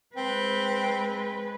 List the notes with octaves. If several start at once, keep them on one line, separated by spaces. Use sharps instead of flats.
G#3 C4 B4